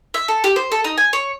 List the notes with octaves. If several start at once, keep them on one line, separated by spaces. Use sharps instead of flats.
E5
A4
G4
C5
A4
D#4
G#5
C#5